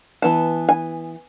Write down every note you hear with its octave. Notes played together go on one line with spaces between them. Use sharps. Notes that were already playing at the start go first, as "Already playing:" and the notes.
E3 B3 A5
G#5